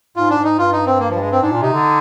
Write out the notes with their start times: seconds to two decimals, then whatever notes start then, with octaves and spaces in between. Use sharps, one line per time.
0.16 G#2 F4
0.30 D4
0.37 G#2
0.45 D#4
0.58 G2 F4
0.72 D#4
0.86 C4
0.99 A#3
1.10 F3
1.15 G3
1.20 G#3
1.32 C4
1.41 G#2 D4
1.52 A#2
1.62 C3 D#4
1.73 D3